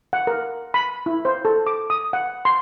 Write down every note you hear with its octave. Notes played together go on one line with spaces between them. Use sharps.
F#5
A#4
B5
E4
C5
A4
D6
D#6
F#5
C6